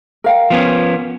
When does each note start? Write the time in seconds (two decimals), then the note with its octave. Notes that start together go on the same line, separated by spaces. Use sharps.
0.24 A#4 F5 G5
0.50 F3 B3 C#4